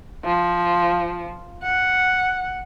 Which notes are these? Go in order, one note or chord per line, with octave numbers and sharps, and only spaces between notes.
F3
F#5